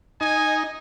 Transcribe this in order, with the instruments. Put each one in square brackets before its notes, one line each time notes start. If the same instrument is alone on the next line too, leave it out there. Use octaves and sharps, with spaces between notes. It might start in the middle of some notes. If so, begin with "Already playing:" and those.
[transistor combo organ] D#4 [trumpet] G#5